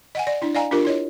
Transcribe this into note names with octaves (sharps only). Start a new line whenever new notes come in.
D#5 F#5 G#5
D5
D4 E4
D5 D#5 F5 G#5 A#5
D4 F4 G4 A#4
E4 C#5 D#5